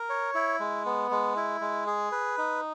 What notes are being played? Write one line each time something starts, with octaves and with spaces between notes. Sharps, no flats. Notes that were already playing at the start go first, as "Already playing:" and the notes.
Already playing: A#4
C#5
E4
G#3
B3
G#3
E4
G#3
G#4
B4
D#4